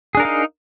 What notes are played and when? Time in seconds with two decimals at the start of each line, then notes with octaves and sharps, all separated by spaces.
0.15 G#4
0.17 D4
0.20 A#4
0.22 F5
0.25 D#4